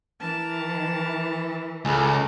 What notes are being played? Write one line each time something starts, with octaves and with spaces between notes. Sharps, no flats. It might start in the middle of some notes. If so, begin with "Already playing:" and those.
E3 A#4 A5
C#2 G#4 A4 G#5 B5